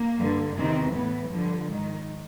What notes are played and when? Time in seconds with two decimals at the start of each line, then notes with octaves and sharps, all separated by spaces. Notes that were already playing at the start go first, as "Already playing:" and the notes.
Already playing: A#3
0.18 G2 D3
0.56 E2 C3 D#3 C4
0.93 A2 E3 B3
1.31 G2 D3 F3
1.69 G#2 D#3